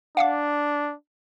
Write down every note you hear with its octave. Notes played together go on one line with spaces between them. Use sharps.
D4 F5 F#5 D6